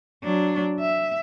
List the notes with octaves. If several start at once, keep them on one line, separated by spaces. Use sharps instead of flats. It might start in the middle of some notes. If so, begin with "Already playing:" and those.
F#3 D4
E5